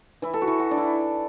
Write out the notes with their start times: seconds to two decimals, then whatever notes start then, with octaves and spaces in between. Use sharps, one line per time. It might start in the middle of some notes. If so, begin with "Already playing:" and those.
0.22 E3 E4
0.33 A4
0.42 F#4
0.47 E3
0.59 F#4
0.71 D4
0.77 E4